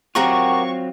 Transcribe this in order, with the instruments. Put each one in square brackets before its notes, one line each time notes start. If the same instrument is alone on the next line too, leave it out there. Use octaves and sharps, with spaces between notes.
[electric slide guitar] F#3 C4 F4 [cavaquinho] G4 A#4 F#5 [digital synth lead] C#6